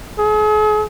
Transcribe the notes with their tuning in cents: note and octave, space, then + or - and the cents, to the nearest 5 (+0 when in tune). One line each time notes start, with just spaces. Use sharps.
G#4 +40